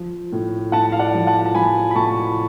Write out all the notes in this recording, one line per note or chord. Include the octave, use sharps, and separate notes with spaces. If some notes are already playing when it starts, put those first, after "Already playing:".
Already playing: F3
A2
A2 F#5 A5
F5
D5 F#5
F3
F#5 A5
A5
F3 G#5 B5
B5
A2 A5 C#6